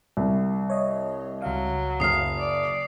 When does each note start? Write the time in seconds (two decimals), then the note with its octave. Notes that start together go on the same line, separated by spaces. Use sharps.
0.17 C2
0.70 C#5 D#5
1.42 C#2 F#3 F5
2.00 F#1 D#6 F6 C7
2.39 D5